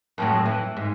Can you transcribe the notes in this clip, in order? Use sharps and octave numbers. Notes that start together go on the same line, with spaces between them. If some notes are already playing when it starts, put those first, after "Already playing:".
F2 A2 F#3
E3
G#2